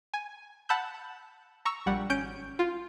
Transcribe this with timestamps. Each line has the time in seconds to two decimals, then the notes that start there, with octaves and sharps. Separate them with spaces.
0.14 G#5
0.69 F#5 A5 B5 E6 G6
1.65 A#5 C#6 E6
1.86 A#1 G3 F#5
2.10 G#1 C#4 G6 D7
2.59 F4